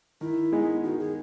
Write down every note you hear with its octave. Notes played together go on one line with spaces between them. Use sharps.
D#3 E4
G#3 B3 D#4 G#4
D#3 F#4
G#4